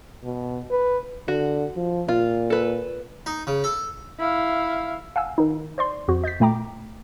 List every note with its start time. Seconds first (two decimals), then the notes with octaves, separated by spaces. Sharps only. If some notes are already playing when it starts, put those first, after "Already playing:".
0.24 B2
0.71 B4
1.28 D3 F#4
1.77 F3
2.08 A#2 F4
2.50 A4 B4
3.26 D#4
3.47 C#3
3.64 A4
4.19 E4 F5
5.16 F5 F#5 G#5 E6
5.38 D#3 D#4
5.78 C5 D5 C6
6.08 F2 F#4 C5
6.24 D#5 G6 A6 B6
6.40 A#2 A3 G5 A#5 D6